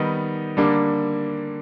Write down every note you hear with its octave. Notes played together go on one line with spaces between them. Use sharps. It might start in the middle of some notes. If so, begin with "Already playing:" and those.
Already playing: D#3 G3 B3 D#4
D3 G3 A#3 D4